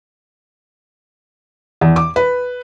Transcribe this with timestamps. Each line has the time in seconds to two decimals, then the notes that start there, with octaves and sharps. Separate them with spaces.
1.81 E2
1.96 D6
2.16 B4